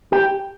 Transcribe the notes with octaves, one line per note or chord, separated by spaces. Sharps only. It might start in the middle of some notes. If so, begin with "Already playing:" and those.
G4